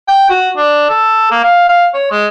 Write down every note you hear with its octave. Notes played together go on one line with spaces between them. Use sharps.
G5
F#4
D4
A4
A#3
F5
F5
C#5
G#3